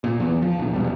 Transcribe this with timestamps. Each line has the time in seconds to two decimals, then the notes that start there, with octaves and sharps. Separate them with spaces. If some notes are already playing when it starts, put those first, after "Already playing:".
0.04 A#2
0.20 E2
0.42 F3
0.59 A#1 E2
0.73 E2 B2 G3